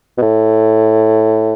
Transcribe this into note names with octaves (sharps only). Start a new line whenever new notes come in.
B2
A2